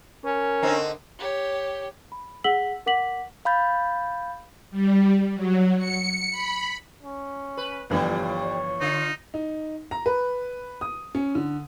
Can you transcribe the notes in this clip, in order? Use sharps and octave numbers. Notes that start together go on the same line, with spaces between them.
C#4 A#4
D3 C4 D#4
G4 C#5
B5
G#4 F#5 E6 B6 F#7 G7
A#4 F#5 D6 B6 F#7
F5 B5 G6 A6
G3
F#3
C#7
B5
C#4
B4
G1 A#2 E3 F3 G3
C#5
D3 D#4 F4
D#4
A#5
B4
D#6
C#4
D3